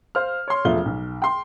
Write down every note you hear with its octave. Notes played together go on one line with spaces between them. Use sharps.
C5 F5 F6
C#5 C6
E1 F3 A3 F4 F5 G7
B1
G5 C6